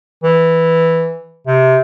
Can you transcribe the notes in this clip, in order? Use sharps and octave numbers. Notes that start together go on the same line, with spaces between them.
E3
C3